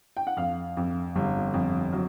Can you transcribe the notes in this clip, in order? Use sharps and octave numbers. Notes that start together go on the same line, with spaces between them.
G5
F#5
F2 F5
F2
G1
F2
F#3